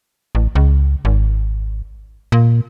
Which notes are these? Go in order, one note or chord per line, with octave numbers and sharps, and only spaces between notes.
A1
C#2
G#1
A#2